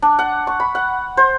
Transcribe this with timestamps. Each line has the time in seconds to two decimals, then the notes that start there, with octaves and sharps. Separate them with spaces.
0.02 D4
0.19 F#5
0.47 C#6
0.60 B5
0.75 F#5
1.17 C5